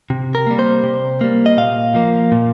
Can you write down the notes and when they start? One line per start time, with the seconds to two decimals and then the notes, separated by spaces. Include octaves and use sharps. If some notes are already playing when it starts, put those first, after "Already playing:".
0.10 C3
0.35 A#4
0.47 G3 A#3
0.59 C5
0.84 C3
1.21 G3 A#3
1.46 D#5
1.57 A#2 F5
1.95 F3 A#3
2.32 A#2